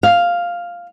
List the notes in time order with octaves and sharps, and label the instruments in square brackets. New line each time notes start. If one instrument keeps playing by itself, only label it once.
[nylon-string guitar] F5